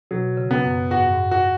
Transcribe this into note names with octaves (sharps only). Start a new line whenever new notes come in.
B2 F#3
C#3
B3
F#2
G#2 F#4
F#2
G#2
F#4